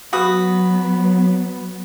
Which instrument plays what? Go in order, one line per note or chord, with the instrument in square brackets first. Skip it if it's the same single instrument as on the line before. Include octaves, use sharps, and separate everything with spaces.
[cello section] F#3 B3 [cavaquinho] F#4 B4 D#6